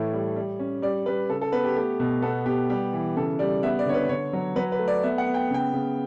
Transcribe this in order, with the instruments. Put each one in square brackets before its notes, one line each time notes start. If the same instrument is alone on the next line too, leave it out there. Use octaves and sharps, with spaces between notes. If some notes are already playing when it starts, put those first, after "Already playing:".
Already playing: [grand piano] A2 E3 A3
G3
G3
C#4
G3 D5
G3 B4
C#3 A4
A4
B3 B4
G4
A3 G4
B2
B3 A4
B3 G4
G3 G4
E3
C#3 A4
G3 D5
B3 E5
D5
D3 C#5
B4
D3 C#5
F#3
F#3 B4
B4
A3
D5
B3 E5
F#5
B3
G5
C#3 G5
C#3